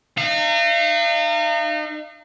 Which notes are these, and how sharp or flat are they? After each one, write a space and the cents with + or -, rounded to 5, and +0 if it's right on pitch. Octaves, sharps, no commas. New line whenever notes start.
D#4 -35 F5 -40